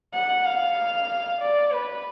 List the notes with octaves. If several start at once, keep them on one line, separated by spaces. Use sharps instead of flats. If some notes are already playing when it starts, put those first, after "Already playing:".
F#5
F5
D5
B4